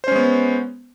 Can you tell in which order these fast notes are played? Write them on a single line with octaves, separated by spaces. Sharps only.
C5 C#4 G#3 B3